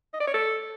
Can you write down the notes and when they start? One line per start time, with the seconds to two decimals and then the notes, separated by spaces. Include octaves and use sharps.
0.13 D#5
0.20 D5
0.27 C#5
0.34 A4